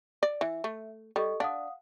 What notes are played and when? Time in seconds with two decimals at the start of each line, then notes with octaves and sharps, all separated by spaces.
0.23 D5
0.41 E3 E5
0.64 A3
1.16 G3 A4 D#5 C#6
1.40 D4 F5 F#5 D#6